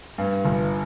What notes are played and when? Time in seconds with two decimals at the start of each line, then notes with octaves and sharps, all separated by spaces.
0.18 G2
0.45 G1